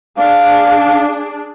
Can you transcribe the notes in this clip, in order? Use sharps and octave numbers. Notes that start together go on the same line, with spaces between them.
D4 G#4 F5